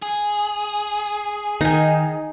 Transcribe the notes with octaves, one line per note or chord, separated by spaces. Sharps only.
G#4
D#3 D#4 G#5